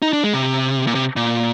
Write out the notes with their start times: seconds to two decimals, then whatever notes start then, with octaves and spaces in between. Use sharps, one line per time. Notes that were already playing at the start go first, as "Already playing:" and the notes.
0.02 D#4
0.13 D4
0.24 G#3
0.33 C3
0.87 A#2
0.95 C3
1.16 A#2